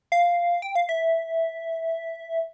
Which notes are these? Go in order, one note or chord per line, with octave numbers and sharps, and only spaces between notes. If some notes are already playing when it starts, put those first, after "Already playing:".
F5
G5
F5
E5